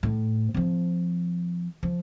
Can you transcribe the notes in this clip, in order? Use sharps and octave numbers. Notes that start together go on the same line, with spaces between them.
A2
F3 C4
F3